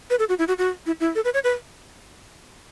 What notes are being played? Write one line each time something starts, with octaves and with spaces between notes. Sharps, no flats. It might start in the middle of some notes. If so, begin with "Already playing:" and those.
B4
A4
F#4
E4
F#4
F#4
E4
E4
A4
B4
C#5
B4